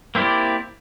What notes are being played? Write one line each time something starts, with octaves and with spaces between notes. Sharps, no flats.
A#3 C4 E4 G4 D5